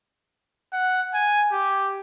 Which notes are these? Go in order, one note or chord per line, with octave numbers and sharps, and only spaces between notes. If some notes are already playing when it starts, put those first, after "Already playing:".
F#5
G#5
G4